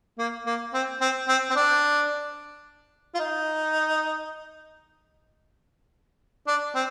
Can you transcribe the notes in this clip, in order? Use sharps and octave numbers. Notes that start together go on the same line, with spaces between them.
A#3
A#3
C4
C4
C4
C4
D4
F4
D#4
D4
C4